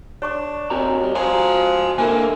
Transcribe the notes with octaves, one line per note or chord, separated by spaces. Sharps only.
D4 C#5 C#6 D6
D#2 C4 F#4 A#5
G3
C#2 F3 F#4 G#5 A#5 C6
D3 A#3 E4 A#4 C5 G#5